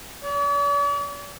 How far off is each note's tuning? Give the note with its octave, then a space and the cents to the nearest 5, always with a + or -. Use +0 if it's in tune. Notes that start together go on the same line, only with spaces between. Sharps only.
D5 -45